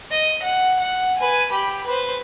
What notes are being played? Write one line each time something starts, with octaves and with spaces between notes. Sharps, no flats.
D#5
F#5
F#5
B4 G#5
G4 B5
B4 C5